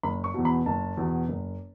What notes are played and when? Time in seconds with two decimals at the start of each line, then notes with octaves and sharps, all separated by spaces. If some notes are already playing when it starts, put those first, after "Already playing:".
0.03 F#1 B5
0.24 C#6
0.34 E2 B2
0.45 B5
0.66 F#1 A5
0.97 E2 B2
1.28 F#1